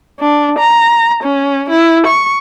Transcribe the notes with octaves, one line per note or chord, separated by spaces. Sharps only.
D4
A#5
C#4
E4
C#6